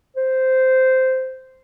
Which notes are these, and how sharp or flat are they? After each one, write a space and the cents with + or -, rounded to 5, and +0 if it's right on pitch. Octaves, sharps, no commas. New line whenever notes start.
C5 -10